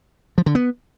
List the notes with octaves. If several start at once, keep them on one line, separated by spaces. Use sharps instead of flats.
F3
D3
B3